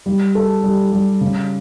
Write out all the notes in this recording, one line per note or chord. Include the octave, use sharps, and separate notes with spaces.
G3
A4
G3
G3
C#3